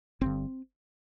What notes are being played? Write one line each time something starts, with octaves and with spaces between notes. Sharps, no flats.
G1 G2 D3 C4